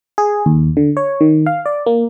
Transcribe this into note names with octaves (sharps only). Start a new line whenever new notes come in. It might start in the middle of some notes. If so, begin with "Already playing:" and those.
G#4
D#2
D3
C#5
D#3
F5
D5
A#3